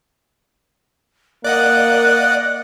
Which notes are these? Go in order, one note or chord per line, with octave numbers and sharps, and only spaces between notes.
A#3 D5 D#5 F#5 F#6